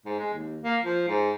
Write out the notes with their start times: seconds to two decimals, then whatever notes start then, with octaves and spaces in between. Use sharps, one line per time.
0.05 G#2
0.19 G#3
0.34 D#2
0.62 A#3
0.84 F3
1.08 G#2